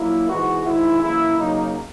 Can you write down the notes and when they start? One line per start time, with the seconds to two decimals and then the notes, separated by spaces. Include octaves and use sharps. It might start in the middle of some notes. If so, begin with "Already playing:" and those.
Already playing: A#2 F#3 A#3 E4
0.28 G#2 E3 G#3 B3 F#4
0.64 G#2 D#3 G#3 E4
1.01 F#2 E3 A#3 E4
1.37 C#3 F#3 A#3 D#4